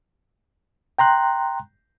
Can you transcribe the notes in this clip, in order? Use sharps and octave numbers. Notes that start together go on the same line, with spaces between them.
G5 A#5 C6 F#6